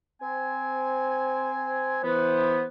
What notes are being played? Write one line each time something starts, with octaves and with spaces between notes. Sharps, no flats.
C4 G#5
E3 B3 C5